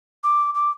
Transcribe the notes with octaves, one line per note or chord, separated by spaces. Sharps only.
D6
D6